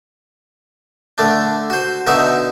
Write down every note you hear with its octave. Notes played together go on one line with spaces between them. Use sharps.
D3 A3 D4
F#4 C5
B2 D3 D#4 F#4 E5